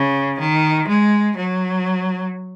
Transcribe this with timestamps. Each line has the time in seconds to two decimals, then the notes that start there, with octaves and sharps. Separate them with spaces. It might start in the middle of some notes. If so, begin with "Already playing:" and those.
Already playing: C#3
0.39 D#3
0.88 G#3
1.36 F#3